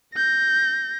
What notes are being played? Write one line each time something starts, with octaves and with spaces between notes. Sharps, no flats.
G6 A#6